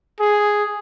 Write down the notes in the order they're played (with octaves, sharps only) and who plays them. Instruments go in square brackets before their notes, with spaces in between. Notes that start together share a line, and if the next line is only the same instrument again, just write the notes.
[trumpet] G#4